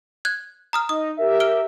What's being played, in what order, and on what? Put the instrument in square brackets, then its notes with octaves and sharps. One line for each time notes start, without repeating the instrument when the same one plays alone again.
[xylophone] F#6 G#6
A#5 D#6 F6
[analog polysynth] D#4 [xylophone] D#6
[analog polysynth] G4 A#4 E5
[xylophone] F6 D7 G7